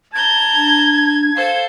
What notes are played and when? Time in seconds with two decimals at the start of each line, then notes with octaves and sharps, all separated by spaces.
0.14 A5 A#5 G6 G#6
0.55 D4
1.35 A4 C5 F5